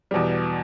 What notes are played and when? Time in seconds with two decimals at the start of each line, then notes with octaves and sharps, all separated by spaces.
0.11 E2 B2 G3